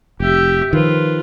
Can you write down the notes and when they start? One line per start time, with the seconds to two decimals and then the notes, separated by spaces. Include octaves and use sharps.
0.20 F1 G4 E5
0.73 D#3 F3 F4 B4